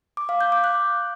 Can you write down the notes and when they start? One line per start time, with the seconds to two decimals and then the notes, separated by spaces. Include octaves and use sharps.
0.17 D6
0.29 F5
0.41 G6
0.52 D6
0.64 F#6